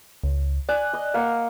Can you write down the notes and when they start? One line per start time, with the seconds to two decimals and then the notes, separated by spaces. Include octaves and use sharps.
0.24 C#2
0.69 D5 G#5 F#6
0.93 D#5
1.14 A#3 F#5